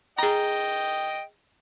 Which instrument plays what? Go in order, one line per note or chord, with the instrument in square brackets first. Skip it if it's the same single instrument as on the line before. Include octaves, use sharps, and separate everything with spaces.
[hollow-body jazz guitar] G#4 A#5 [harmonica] D#5 G5